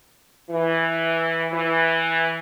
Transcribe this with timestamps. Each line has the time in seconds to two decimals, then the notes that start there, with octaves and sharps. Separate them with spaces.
0.50 E3
1.51 E3